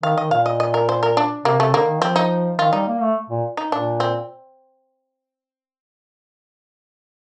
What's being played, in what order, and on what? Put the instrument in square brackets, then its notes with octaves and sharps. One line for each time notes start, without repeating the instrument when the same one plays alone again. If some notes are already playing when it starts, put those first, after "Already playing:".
[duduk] D#3 [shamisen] F5
[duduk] D#3 [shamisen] D#5
[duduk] A#2 [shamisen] F5
[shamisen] D#5
D#5
A#4
C5
A#4
D4
[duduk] C3 [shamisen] A#3
[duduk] C3 [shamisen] A3
[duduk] D3 [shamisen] A#3
[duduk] D#3
[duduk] F3 [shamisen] C4
[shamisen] D#4
[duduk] D#3 [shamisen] F4
[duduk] G3 [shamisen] D#4
[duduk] A#3
A3
A#2
[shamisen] D#4
[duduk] A#2 [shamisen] D4
[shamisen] C4